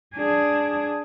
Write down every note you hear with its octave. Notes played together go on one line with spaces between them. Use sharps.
D4 G#4